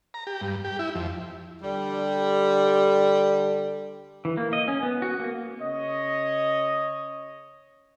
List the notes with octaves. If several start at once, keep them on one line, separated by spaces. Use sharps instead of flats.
A#5
G4
G2
G4
E4
F2
D3 G3
E3
A#3
D#5
C#4
B3
F#4
A#3
C#3 C#5 D#5